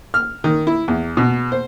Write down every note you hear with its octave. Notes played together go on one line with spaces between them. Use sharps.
F6
D#3
E4
E2
B2
C5